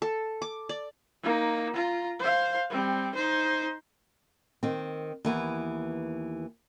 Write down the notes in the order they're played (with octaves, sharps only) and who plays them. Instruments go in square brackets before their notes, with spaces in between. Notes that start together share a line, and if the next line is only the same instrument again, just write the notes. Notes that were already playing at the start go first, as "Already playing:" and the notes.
[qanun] A4
D6
D5
[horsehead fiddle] A#3 D#4
F4 A#5
C5 F5
G3 C4
D#4 C5
[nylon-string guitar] D#3 C4
D#2 E3 B3